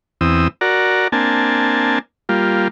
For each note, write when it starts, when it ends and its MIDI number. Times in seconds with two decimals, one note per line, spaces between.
0.21 0.48 40
0.21 0.48 60
0.21 0.48 87
0.21 0.48 88
0.61 1.08 66
0.61 1.08 70
0.61 1.08 74
1.12 1.99 58
1.12 1.99 60
1.12 1.99 62
1.12 1.99 80
1.12 1.99 81
2.29 2.68 55
2.29 2.68 58
2.29 2.68 65